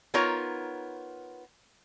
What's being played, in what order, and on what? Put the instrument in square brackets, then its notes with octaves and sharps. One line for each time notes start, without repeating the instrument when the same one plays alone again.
[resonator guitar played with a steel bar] B3 D#4 F4 A#4 C#5 A#5